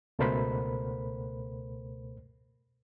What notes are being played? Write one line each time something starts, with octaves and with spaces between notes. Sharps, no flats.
C#2 B2 A3 A#4 C5 B5